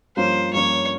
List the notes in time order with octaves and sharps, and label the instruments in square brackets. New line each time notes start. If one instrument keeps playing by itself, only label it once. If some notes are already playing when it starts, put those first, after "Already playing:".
[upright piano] G2 F3 A#3 C#4 [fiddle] C5
[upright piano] G2 F3 A#3 C#4 [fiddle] C#5